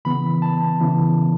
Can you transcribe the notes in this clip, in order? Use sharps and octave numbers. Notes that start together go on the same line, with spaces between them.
C#3 E3 B3 B5
A5
C#3 E3 B3